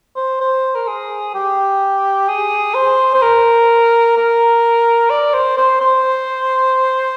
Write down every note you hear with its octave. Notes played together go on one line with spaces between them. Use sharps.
C5
C5
A#4
G#4
G4
G#4
C5
C5
A#4
A#4
D5
C5
C5
C5